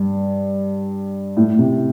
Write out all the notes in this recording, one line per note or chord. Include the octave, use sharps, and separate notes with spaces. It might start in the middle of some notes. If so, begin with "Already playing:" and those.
Already playing: G2
A2
C3